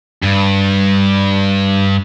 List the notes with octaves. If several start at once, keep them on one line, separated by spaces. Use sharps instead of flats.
G2